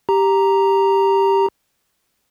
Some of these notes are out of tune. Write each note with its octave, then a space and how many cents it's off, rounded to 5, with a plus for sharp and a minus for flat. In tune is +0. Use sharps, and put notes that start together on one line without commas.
G4 +0 A#5 +0